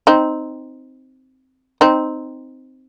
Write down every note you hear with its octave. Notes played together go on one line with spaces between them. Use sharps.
C4 D#4
C4 D#4